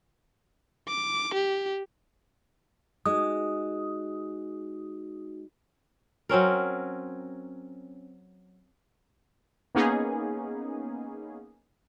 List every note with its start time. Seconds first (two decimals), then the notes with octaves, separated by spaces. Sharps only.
0.88 D6
1.34 G4
3.06 G#3 D#4 F#4 D#6
6.29 F#3 C4 C#4 A#4
9.75 A#3 B3 C#4 D#4 G#4